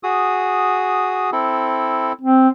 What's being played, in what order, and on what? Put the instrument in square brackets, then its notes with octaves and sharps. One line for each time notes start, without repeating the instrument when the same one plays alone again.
[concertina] F#4 G#4 D#6
C4 E4 A4
[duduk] C4